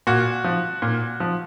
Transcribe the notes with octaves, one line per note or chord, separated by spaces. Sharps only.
A#2 F#4
F3
A#2
F3